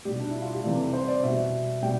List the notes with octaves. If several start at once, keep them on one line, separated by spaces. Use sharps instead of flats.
B2 G3 G4
D4
E4
F4
G4
C3 E3 G3 A4
C5
D5
B2 G3 E5
B2 G3 G5